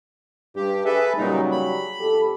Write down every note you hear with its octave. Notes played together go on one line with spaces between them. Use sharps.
G2 G4
G#4 A4 B4 E5
A#2 C#3 F#3 G3 D#4
B5
F2 G4 A4